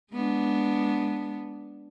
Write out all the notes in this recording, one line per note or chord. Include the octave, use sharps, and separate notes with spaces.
G#3 B3 D4